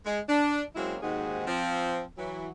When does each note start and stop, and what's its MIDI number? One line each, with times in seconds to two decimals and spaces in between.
0.06 0.20 56
0.29 0.63 62
0.76 0.96 54
0.76 0.96 56
0.76 0.96 58
0.76 0.96 60
0.76 0.96 61
0.76 0.96 64
1.02 1.46 39
1.02 1.46 44
1.02 1.46 56
1.02 1.46 60
1.02 1.46 66
1.02 1.46 68
1.47 2.03 53
1.47 2.03 60
2.18 2.48 52
2.18 2.48 54